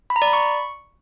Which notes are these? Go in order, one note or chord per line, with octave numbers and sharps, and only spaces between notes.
B5
A#5
D5
B5
C#6